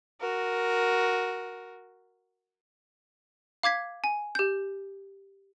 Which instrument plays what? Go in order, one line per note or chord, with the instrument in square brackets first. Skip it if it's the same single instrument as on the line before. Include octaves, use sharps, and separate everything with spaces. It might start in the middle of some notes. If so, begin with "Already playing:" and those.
[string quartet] F#4 A#4
[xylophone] F5 D6 G#6 B6
G#5
G4 G6